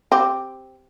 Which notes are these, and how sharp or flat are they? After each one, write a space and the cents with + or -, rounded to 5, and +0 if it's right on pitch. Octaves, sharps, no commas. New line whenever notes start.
C4 +0 G4 +0